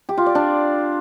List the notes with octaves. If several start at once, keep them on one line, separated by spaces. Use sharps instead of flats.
G4
F4
D5
D4